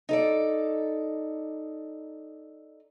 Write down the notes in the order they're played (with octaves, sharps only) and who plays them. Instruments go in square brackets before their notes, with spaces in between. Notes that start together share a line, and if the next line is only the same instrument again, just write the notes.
[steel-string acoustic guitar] D#4 A4 D5